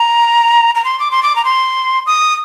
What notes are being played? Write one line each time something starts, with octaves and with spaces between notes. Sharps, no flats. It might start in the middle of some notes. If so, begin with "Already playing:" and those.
Already playing: A#5
A#5
C6
D6
C6
D6
A#5
C6
D#6